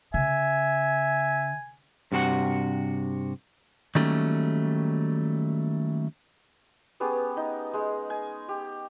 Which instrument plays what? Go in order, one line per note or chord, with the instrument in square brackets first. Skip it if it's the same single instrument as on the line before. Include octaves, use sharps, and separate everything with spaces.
[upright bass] C#3 [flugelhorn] E5 [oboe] G#5
[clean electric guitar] G2 C3 F#4 A4 F#5
[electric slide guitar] D#3 F#3 G3 A3 A#3 C#4
[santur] B3 C#4 G4 G#4
D#4
G#3 G#4
G#5
G4